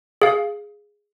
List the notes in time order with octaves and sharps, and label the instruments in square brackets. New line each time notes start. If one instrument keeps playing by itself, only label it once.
[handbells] G#4 F5